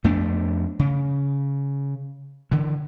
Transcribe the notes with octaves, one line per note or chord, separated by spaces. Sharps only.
F2 A3 B3 D4
C#3
D3 E3